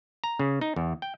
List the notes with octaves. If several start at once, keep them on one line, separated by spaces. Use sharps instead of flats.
A#5
C#3
D#4
E2
G5